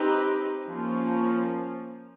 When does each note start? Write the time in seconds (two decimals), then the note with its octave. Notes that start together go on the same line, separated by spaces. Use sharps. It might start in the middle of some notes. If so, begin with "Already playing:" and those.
Already playing: C4 D#4 G4 B4
0.68 F3 A#3 C#4